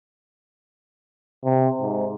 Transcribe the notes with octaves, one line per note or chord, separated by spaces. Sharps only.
C3
G#2